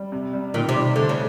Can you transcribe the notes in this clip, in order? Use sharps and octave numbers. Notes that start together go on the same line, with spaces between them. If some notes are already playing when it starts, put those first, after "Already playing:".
Already playing: G3
C3
G3
A#2 D#3
C3
G3
D3 A3
C#3